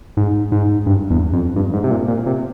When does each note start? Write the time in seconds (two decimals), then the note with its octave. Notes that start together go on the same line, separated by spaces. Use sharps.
0.17 G#2
0.52 G#2
0.86 G2
1.10 E2
1.33 F2
1.56 G2
1.74 G#2
1.84 C3
1.91 A#2
2.08 A#2
2.26 C3